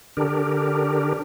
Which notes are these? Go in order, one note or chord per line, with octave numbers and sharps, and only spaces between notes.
D3 D4 G4 A#4